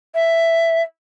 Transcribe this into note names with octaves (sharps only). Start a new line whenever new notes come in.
E5